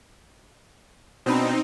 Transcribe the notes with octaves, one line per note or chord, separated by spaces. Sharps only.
B2 C4 D4 D#4 B5